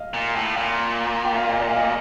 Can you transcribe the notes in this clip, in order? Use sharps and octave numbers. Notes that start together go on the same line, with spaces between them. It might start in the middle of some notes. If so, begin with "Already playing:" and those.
Already playing: D#5 F5
A#2
A2
A#2
G5
F5
D#5
D5
F5
D#5